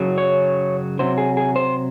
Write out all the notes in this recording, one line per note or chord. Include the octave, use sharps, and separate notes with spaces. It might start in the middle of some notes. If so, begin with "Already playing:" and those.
Already playing: F#2 C#3 F#3
C#5
C3 F#3 C5
G#4
G#4
C5